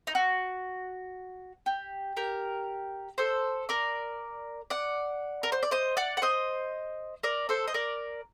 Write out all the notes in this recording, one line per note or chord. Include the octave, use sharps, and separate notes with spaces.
D#4
F#4
G4
G4 A#4
A4 C5
A#4 D5
D5 F#5
A#4
C5
D5
C5 D#5
D5 F#5
F#5
C5 D#5
A#4 D5
A4 C5
D#5
A#4 D5